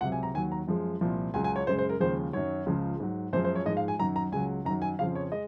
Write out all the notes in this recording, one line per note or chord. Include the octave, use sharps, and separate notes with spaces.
C#2 C3 F#3 F#5
G#5
A#5
D#2 D#3 F#3 G#5
A#5
F#2 F3 G#3
C2 A#2 F3
C#2 C#3 F#3 G#5
G#5
C#5
F#2 C#3 G#3 C5
C5
A#4
D#2 C#3 F3 G#3 C5
F#2 D#3 F#3 C#5
C#2 C#3 F3
G#2 F#3
F#2 F3 G#3 C5
C5
C#5
G#2 F3 G#3 D#5
F5
G#5
F#2 D#3 F#3 A#5
A#5
C#2 C#3 F#3 G#5
F#2 D#3 F#3 A#5
G#5
F2 C#3 F3 F5
C#5
G#3 D#5